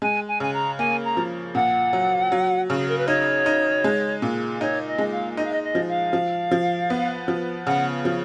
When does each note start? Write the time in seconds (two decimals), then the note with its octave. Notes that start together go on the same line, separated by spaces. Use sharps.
0.02 G#3 G#5
0.28 G#5
0.40 C#3 G#5
0.53 A#5
0.78 A#3 G#5
1.04 A#5
1.17 F3
1.55 A#2 F#5
1.93 F#3
2.32 F#3
2.67 C#3 F#4
2.77 G#4
2.88 A#4
2.97 B4
3.07 D#4 C#5
3.46 D#4
3.84 G#3
4.22 A#2
4.60 D#4 C#5
4.86 D#5
4.98 G#3
5.11 F5
5.37 D#4 D#5
5.44 F5
5.52 D#5
5.63 D#5
5.75 F3
5.88 F5
6.13 F3
6.51 F3
6.90 B3
7.28 F3
7.66 C#3 F#5
8.05 F3